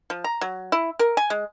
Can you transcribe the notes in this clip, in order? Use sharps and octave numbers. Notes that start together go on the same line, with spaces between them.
F3
A#5
F#3
E4
A#4
G#5
G#3